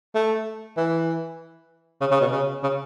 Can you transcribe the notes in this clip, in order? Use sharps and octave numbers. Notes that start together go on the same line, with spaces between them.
A3
E3
C#3
C#3
B2
C#3
C#3